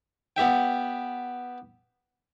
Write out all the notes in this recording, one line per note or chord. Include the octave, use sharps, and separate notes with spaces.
B3 G4 E5 G5